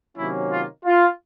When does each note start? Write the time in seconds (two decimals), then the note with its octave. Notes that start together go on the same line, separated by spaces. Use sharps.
0.16 C3 D#3 F#3 A#3 C#4 E4
0.50 F4
0.84 F4